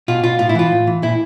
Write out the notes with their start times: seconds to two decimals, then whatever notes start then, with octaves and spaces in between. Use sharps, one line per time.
0.08 B2 F4
0.24 B2 F4
0.39 A2 F4
0.49 E4
0.55 E3 F4
0.72 A2
0.87 E3
1.02 A#2 E4